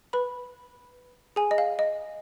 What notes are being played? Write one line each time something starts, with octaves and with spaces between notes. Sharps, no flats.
B4 B5
G#4 G#5
D#5
F5
D#5